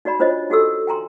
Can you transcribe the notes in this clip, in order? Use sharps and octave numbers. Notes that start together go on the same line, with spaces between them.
D#4 F#4 D5 B5
D4 F4 C5 C#5 D#5
D#4 F#4 G4 A4 E6
G5 G#5 A#5 C6